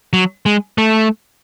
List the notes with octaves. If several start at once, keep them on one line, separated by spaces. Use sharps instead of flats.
F#3
G#3
A3